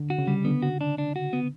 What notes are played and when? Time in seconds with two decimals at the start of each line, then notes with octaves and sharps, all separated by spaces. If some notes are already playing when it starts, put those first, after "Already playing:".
Already playing: D3
0.10 F#4
0.18 C#3
0.28 G3
0.45 D3 B3
0.62 F#4
0.81 D4
0.98 D4
1.16 F#4
1.33 B3